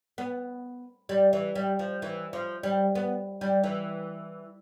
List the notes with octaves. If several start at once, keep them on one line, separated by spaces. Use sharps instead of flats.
B3
G3
E3
G3
F3
E3
F3
G3
B3
G3
E3